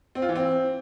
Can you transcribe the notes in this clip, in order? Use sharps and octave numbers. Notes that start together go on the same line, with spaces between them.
C4
F4
E3
C4